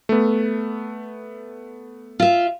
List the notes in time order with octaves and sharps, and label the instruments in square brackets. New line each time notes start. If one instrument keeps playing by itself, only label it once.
[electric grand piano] A3 B3
[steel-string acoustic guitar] F4 E5